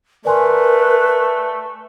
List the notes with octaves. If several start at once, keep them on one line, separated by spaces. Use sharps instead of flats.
A3 A#4 B4 D5 G#5 C6